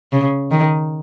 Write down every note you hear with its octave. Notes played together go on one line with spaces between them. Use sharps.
C#3
D#3